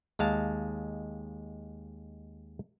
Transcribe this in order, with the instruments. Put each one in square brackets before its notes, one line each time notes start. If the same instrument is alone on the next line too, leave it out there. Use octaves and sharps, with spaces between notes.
[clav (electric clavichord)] D#2 G#3 F5 A5